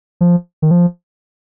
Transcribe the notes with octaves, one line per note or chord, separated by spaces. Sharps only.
F3
D#3
F3